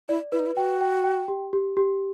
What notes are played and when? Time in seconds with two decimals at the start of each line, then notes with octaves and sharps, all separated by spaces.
0.09 E4 D5
0.32 E4 B4
0.39 D#4
0.46 E4
0.56 F#4 G5
0.81 G5
1.04 G5
1.28 G4
1.53 G4
1.77 G4